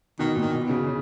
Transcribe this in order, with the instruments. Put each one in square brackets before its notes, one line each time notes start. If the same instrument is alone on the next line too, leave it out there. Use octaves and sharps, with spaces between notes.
[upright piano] B2 [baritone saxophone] D#3
[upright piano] A#2 [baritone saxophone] D#3
[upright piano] B2
[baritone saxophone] B2
[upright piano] C#3
C#3